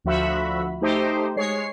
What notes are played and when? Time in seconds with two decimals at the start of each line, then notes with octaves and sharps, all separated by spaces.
0.04 D2 F3 F#4 E5 B5
0.81 A3 D#4 G4 C5
1.36 G#3 C#5 C7